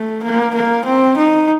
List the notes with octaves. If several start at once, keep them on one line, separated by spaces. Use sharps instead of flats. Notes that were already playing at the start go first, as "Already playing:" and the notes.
Already playing: A3
A#3
A#3
C4
D#4